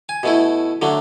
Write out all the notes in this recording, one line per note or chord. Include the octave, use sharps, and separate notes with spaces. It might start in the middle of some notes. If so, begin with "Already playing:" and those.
G#5
B2 A3 E4
D3 F#3 A3